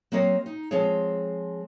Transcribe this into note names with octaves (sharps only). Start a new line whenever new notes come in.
F#3 A#3 C4 F#4 C#5 D#5
D#4
F3 G#3 C4 G#4 C#5